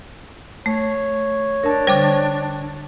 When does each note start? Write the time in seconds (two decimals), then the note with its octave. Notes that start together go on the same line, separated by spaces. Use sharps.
0.66 A3 C#5
1.63 D4 A#4 A5
1.87 D3 G3 C5 G5 D6